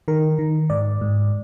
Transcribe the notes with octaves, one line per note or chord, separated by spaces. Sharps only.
D#3 A#4
D#3
G#2 D5
G#2